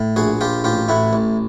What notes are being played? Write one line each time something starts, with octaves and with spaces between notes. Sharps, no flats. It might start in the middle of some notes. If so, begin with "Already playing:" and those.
Already playing: A2
A#1 F#4 G#4
A#1 F4 G4
A1 F4 G4
A2 E4 F#4
A1